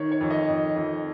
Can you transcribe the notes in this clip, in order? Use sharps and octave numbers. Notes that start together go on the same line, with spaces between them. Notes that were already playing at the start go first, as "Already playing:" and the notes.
Already playing: D#3 C#5
C#5
F2
D#5
F2
F2